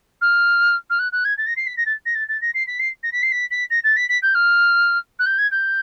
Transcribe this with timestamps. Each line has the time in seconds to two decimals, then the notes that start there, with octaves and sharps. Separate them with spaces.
0.21 F6
0.90 F6
0.99 F#6
1.12 F#6
1.25 G#6
1.38 A6
1.47 A#6
1.56 C7
1.67 B6
1.77 A#6
1.86 A6
2.06 A#6
2.15 A6
2.29 A6
2.41 A#6
2.54 C7
2.67 B6
2.79 C7
3.03 A#6
3.12 B6
3.23 C7
3.32 B6
3.51 B6
3.70 A#6
3.84 A6
3.96 B6
4.09 B6
4.22 G6
4.35 F6
5.19 F#6
5.26 G6
5.38 G#6
5.51 G6